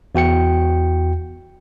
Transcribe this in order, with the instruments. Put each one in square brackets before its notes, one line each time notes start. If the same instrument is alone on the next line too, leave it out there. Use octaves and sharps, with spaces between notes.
[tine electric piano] E2 F#4 G5 C#7